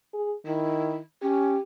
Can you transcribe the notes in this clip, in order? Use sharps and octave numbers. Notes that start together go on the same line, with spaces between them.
G#4
D#3 E4
C#4 G4